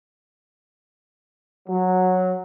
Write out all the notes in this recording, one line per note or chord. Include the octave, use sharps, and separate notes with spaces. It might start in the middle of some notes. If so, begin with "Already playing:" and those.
F#3